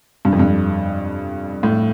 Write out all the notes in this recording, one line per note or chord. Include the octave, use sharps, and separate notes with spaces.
G2
F2
G2
A2